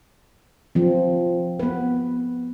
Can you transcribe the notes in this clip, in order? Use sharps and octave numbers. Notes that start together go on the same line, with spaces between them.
F3 C4
B3 B4